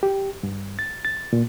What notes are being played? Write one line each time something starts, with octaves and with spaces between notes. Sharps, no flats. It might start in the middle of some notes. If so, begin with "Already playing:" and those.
G4
G2
A6
A6
A#2